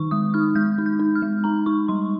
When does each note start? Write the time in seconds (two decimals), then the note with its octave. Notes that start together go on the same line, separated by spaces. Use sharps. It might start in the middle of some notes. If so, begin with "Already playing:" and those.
Already playing: D#3 D#4 C#6
0.11 G#3 D#6
0.34 D#4 F6
0.55 G#3 G6
0.78 D#4
0.86 G6
1.00 D#4
1.15 F6
1.22 G#3
1.44 D#4 A#5
1.66 D#4 C#6
1.88 G3 C6